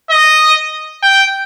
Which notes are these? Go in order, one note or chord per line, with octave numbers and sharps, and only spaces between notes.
D#5
G5